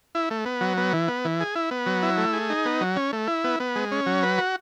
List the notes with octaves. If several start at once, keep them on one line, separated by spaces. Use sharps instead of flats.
E4
A3
B3
F#3
B3
E3
B3
E3
G#4
E4
B3
F#3
E4
A3
G#4
D#4
B3
F#3
C#4
A3
E4
B3
B3
G#3
C#4
F#3
B4
F#4